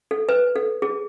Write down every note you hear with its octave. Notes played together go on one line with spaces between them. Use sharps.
A4
B4
A4
G#4